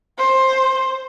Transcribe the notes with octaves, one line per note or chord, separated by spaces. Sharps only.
C5